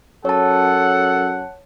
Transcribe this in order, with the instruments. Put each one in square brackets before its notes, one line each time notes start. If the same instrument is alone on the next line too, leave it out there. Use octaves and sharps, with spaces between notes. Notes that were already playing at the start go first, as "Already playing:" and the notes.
[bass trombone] F#2 [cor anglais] A4 [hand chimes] C#5 A5 [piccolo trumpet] F#5